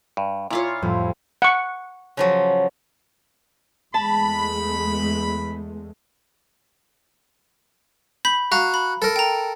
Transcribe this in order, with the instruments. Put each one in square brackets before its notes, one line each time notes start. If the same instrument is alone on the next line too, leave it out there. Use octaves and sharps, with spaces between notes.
[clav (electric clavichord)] G2
[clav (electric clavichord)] A#2 [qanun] E4 F4 C#5
[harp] F2 A2 G3
[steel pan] F#5 C#6
[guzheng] C#3 F3 F#3
[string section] E2 G#3 A3 [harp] A5 [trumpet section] B5
[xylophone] B5 G6 B6
[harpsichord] F#4 [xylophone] F5 A#5
[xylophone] B5
[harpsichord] A4 A#4
[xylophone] G5 A#5